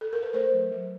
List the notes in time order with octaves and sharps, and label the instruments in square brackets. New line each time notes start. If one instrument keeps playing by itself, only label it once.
[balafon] A4
A#4
B4
A3 A#4 C5
F#3
F#3